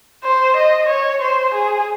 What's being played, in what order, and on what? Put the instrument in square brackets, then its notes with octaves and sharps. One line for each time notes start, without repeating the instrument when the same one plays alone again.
[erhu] C5
D#5
C#5
C5
G#4